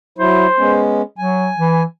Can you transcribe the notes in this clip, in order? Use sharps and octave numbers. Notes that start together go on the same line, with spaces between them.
F#3 E4 C5
G#3 B3 C#4
F#3 G#5
E3